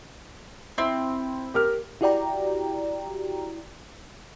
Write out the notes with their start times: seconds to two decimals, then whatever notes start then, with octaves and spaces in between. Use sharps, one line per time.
0.78 C4 E4
1.54 G4 A#4 F6
2.01 E4 F#4 G4 D5 G5 A#5